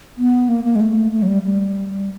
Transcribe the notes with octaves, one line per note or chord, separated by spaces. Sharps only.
B3
A#3
A#3
G#3
A3
A3
F#3
G3
G3